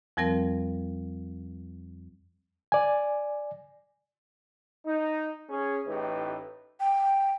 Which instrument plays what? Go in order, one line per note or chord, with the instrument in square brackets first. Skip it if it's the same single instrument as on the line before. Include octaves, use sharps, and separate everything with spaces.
[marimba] F2 F3 G3 C4 A#4
[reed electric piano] D5 G#5
[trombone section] D#4
C#4 G#4
A1 A2 E3 D#4 G4 B4
[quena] G5